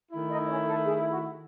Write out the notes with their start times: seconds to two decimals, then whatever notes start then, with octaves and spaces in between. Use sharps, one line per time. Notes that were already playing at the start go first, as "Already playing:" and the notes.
0.12 D#3 A3 E4
0.30 D#4 D#5
0.48 C#4 C#5
0.66 A4
0.85 G#4
1.09 F#4